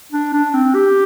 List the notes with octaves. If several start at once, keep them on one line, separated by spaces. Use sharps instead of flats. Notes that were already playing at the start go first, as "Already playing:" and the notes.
D4
D4
C4
G4